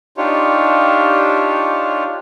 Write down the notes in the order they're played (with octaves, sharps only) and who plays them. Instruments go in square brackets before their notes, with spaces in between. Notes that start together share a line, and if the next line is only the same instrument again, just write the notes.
[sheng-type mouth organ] D4 D#4 F4 G4 C#5